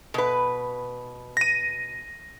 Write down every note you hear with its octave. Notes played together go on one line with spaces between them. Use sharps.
B2 B4
A#6 D#7